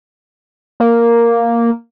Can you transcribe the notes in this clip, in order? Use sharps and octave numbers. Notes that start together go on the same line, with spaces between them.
A#3